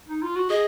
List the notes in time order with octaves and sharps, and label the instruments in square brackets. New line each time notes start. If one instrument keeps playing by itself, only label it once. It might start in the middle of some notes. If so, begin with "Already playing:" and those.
[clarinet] D#4
F4
F#4
[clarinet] G#4 [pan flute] D#5